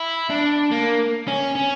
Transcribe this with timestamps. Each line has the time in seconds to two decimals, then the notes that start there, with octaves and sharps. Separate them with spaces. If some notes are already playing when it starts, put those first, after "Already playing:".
Already playing: E4
0.30 D4
0.72 A#3
1.28 C#4
1.55 C#4